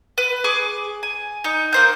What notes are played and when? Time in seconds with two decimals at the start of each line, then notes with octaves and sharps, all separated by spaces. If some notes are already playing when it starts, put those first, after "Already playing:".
0.18 B4
0.44 G#4 C#6 D6
1.03 G#5
1.44 D#4
1.73 A#3 C5 G6